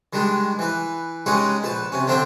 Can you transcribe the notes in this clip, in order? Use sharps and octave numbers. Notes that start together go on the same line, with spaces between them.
D#3 G3 G#3 D4
E3 B4
G3 G#3 C#4 D#4 B4 F#5
A#1 B4 A5
C3 C#4
D3 C4 D4 C5 E5 G5